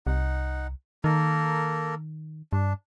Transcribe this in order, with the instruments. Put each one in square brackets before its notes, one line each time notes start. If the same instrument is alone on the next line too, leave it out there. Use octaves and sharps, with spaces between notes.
[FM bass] C2 [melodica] D#4 F#5
[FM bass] D#3 [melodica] A#3 A4 A#4
[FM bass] G2 [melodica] D4